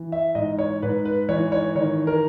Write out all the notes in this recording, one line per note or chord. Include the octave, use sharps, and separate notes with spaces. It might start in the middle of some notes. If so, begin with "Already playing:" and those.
Already playing: E3
E5
G#2 D#5
C#5
G#2 B4
B4
E3 C#5
C#5
D#3 C#5
A#4